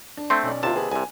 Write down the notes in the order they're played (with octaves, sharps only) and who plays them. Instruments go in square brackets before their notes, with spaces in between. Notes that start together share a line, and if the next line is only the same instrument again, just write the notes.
[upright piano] D4
[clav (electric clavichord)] A3 C4 [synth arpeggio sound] C6 G6
[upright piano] B1 C#4 D5
[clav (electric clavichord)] D#2 C3 A5 [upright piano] E4 F4
[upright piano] G#4 B4
[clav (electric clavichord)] C2 C3 [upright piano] G#5